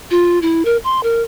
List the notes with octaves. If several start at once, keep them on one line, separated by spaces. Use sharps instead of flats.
F4
E4
A#4
C6
A#4